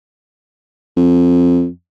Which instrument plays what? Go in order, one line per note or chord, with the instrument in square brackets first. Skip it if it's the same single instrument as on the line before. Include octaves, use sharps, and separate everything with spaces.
[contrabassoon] F2